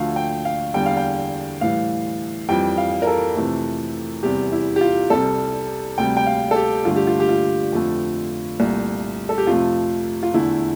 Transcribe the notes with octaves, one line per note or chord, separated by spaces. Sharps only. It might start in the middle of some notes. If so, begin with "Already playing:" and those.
Already playing: D2 D3 F3 A3 F5
G5
F5
E2 D3 G3 G5
F5
G5
A2 E3 G3 F5
F2 E3 G3 G5
F5
A#4
A4
F2 C3 E3 A3
E2 C3 E3 G3 G4
E4
G4
F4
C2 C3 G3 A4
D2 C3 G3 G5
G5
F5
A4
G4
G2 D3 A3 F4
G4
F4
G4
F4
F2 D3 F3 A3
C2 A#2 A3
A4
G4
F2 C3 F3 A3 F4
F4
E2 D3 A3 E4